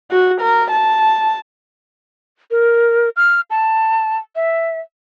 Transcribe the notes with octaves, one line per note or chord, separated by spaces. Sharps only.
F#4
A#4
A5
A#4
F6
A5
E5